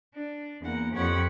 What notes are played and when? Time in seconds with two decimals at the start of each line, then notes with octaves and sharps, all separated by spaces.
0.13 D4
0.62 E2 A#3 F#5
0.94 F2 G4 C#5 F#5 B5